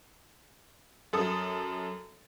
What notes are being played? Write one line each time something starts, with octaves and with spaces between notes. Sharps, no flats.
F#2 A4 D#6